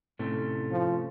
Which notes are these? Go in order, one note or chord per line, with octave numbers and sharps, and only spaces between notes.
A2 C3 A3 C#4
F3